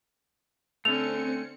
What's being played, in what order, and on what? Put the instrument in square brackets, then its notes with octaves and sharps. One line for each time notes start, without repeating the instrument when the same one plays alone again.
[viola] D3 [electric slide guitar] A3 C#4 [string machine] C4 C#7 [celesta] F7